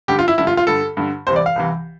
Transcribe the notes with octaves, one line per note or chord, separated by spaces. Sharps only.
G2 D3 G4
F4
E4
G2 D3 E4
F4
F4
G2 D3 A4
G2 D3
C2 C3 E3 C5
D5
F5
C2 C3 E3